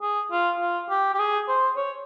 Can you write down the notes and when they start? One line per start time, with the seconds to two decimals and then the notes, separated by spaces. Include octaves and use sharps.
0.02 G#4
0.31 F4
0.60 F4
0.90 G4
1.14 G4
1.19 G#4
1.48 C5
1.77 C#5